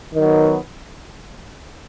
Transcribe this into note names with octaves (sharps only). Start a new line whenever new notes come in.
D#3 F#3 B3